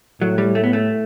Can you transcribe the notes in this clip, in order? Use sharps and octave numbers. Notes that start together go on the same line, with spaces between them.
A2 F#3
G3
A3
B3
A3